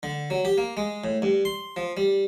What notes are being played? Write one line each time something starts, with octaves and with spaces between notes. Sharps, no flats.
D3
F#3
G4
A#3
G#3
A2
G2
C6
F3
G3